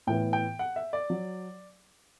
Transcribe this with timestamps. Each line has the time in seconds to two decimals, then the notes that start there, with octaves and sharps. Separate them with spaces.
0.07 A2 E3 B3 G5
0.33 G5
0.59 F#5
0.76 E5
0.93 D5
1.10 F#3